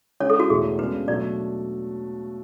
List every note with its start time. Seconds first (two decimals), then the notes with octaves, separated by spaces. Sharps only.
0.20 C#3 G#3 D4 C#5
0.30 A4
0.40 F#4
0.49 E2 B2 A3 E4 G#4
0.79 C#3 G#3 B3 D4 B4
1.08 B2 F#3 A3 D4 D5